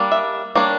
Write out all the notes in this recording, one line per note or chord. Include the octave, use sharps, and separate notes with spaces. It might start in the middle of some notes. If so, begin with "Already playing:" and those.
Already playing: G3 A#3 D4
E5
G3 A#3 D4 C#5